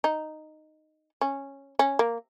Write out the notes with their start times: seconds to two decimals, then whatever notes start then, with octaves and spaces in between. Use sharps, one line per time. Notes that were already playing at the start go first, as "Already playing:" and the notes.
0.04 D#4
1.21 C#4
1.79 C#4
1.99 A#3